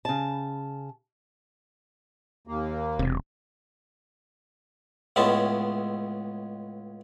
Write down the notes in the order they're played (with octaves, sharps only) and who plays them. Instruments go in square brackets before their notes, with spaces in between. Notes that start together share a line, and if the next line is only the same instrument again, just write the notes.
[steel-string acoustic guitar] C#3 A5
[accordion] D#2 A#3
[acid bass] E1 [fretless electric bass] C3
[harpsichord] C#2 A2 G#3 B3 C#4 A5